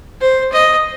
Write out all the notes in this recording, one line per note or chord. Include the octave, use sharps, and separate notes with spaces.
C5
D#5